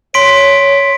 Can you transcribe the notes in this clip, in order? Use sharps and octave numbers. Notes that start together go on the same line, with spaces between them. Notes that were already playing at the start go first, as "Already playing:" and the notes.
C#5 C6 B6 D7